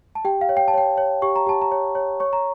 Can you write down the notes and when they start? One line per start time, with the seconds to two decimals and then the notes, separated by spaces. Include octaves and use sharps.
0.15 A5
0.25 G4 G5
0.41 F5
0.49 C#5
0.57 G5
0.68 A5
0.74 C#5 G5
0.98 C#5
1.22 G4 C#6
1.36 A#5
1.47 G4 A5
1.62 A#5
1.72 C#5
1.95 C#5
2.20 C#5 C#6
2.33 A#5